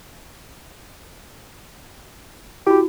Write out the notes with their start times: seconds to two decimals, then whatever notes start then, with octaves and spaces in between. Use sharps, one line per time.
2.66 E4 F#4 G4